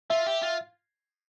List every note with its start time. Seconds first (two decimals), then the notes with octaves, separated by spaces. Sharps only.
0.10 F4 E5
0.26 G4
0.43 F4